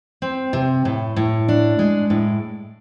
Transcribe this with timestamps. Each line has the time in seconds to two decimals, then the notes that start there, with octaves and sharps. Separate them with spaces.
0.22 C4
0.53 C3
0.85 A2
1.16 A2
1.48 D4
1.79 G#3
2.10 A2